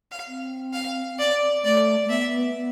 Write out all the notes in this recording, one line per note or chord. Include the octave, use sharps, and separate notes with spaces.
F5
C4
F5
D5
A3 D5
A3
B3 E5
B3